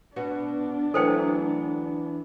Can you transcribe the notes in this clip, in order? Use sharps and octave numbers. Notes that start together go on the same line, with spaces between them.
B2 B3 D4 F#4
D2 E3 F#3 A4 B4 C5 G5